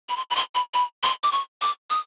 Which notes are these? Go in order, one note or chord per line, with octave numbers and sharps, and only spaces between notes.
B5
C6
B5
C6
B5
B5
C6
D6
C#6
D6
D#6